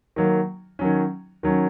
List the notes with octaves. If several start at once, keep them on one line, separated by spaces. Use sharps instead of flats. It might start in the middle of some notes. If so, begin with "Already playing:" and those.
D#3 F#3 A#3
D#3 F#3 C#4
D#3 F#3 C#4